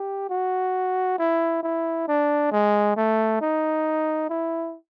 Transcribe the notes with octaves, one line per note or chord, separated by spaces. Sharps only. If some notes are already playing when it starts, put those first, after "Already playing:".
Already playing: G4
F#4
E4
E4
D4
G#3
A3
D#4
E4